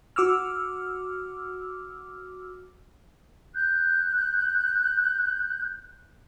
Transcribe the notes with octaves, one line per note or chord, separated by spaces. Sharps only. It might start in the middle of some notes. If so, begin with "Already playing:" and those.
F#4 D6 E6 F6
F#6 G6